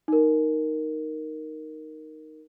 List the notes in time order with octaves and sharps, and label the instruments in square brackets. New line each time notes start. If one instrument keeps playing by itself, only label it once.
[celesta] D#4 A#4